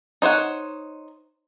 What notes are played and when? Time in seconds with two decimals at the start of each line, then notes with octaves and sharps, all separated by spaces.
0.22 D#4 C5 C#5 F#5